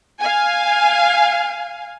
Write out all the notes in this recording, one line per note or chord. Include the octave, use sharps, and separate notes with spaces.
F5 G#5